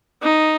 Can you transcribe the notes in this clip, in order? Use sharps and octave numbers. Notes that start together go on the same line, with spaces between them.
D#4